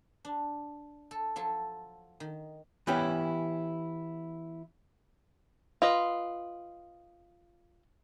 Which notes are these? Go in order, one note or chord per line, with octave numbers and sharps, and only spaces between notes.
D4
A4
F3 F#3 A4
D#3
E3 B3 C#4 E4 G4
F4 B4 D#5